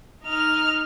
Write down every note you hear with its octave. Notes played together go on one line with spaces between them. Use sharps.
D#4 F6